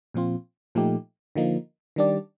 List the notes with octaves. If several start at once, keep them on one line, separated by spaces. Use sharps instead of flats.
A#2 F3 C4 F4
A#2 F3 A3 D#4 G4
D3 F3 A#3 D#4
D#3 G3 D4 G4 D5